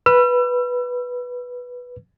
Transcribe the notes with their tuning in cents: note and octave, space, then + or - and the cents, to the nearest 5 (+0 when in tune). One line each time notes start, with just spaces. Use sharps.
B4 -5 E6 +40